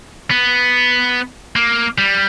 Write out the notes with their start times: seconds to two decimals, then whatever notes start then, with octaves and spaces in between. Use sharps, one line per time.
0.31 B3
1.56 A#3
1.98 G3